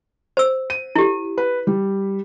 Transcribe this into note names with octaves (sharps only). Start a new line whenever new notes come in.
C5 E6
D#7
E4 G4
B4
G3